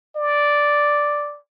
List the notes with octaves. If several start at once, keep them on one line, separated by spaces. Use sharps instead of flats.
D5